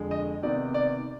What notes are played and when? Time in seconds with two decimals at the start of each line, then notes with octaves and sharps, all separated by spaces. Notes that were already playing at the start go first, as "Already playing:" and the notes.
Already playing: F2 D3 G#3
0.11 D#5
0.42 C3 D#3 B3 D5
0.74 D5